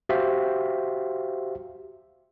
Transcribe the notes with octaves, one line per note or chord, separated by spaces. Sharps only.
F#4 G4 C5 E5 F5